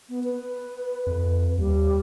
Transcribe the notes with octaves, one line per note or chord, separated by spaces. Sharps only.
B3
B4
F2
D#2 G3